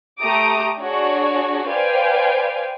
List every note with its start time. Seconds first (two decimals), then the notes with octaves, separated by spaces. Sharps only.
0.19 A3 G4 A#5 D6 D#6 D7
0.80 D4 F#4 G#4 C#5
1.68 B4 C5 D5 F5 G5 G#5